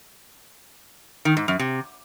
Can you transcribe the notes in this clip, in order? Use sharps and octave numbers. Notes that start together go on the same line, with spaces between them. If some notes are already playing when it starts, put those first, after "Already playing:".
D#3
G#2
F#2
C3